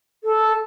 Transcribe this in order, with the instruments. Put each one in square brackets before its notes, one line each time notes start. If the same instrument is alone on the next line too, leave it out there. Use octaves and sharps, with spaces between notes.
[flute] A4